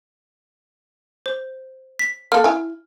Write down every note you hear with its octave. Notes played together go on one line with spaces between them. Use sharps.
C5
B6
A#3 A4 F6
E4 G#5